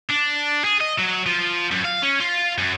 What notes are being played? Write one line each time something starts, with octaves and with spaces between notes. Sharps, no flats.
D4
G#4
D#5
F#3
F3
F#2
F5
C#4
F4
F#2